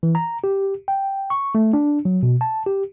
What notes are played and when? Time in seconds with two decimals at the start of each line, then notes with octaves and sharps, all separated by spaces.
0.03 E3
0.15 A#5
0.44 G4
0.88 G5
1.30 C#6
1.55 A3
1.73 D4
2.05 F#3
2.23 B2
2.41 A5
2.66 G4